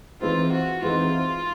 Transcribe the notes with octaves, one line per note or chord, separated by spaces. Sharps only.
E3 G#3 C4 D#4 F4
F#4
E3 G#3 C4 D#4 F4